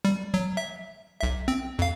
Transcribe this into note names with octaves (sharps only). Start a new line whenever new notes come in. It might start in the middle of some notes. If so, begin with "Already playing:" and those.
G3
F#3
E5
B1 E5
C4
F2 F5